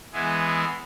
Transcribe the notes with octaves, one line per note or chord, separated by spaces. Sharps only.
E3 G#3 B3 E4 G#4